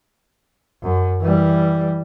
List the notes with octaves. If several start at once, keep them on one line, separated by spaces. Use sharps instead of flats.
F#2
E3 G3